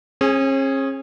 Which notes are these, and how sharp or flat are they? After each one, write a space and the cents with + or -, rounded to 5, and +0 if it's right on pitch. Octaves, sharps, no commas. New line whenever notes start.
C#4 -40 G#4 +0